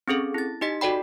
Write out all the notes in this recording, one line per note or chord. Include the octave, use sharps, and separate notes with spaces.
C4 C#4 G#4 A4
E4 A6
D#4 G4 D#5 B6
F#4 A4 D5 G5 B5